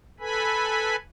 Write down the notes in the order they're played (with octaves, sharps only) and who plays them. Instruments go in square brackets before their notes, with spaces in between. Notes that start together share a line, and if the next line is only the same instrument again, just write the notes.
[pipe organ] A4 B4 G#5 B5